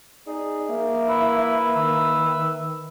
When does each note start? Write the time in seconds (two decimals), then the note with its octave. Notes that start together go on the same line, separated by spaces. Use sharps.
0.27 D#4 G#4 D5
0.69 A#3 E5
1.08 E4 B4
1.75 D#3 E5